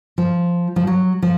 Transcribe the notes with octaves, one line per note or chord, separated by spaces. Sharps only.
F3
F3
F#3
F3